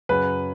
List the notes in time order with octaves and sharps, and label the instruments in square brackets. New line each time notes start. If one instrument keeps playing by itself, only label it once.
[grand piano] F#2 C#3 F#3 B4